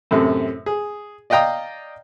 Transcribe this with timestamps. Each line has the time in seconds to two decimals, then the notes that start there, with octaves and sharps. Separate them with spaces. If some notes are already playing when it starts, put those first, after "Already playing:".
0.11 F#2 A2 C3
0.66 G#4
1.30 D5 D#5 F5 G5 A#5 D#6